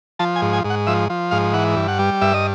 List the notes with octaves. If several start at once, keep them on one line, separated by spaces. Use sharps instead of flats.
F3 A5
G#5
G#2
G#5
G#2
F#5
F3 E5
F3
G#2 F5
E3 F#5
G2
F#5
G3
G2 E5
D#5